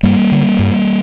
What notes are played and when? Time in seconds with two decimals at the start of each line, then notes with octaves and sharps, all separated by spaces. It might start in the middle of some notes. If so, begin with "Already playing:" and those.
0.03 G2 G3 A#3
0.32 D3
0.59 G2